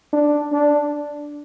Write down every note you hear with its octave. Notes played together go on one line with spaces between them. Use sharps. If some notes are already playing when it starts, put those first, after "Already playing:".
D4
D4